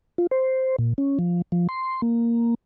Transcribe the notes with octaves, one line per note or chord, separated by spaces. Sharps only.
F4
C5
A#2
C#4
F3
F3
C6
A#3